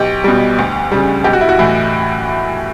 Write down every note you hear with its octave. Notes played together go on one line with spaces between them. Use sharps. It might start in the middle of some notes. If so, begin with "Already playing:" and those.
Already playing: B1 G4
B2 G3
D2
C#3 G3
B1 G4
F#4
E4
F#4
A2 E3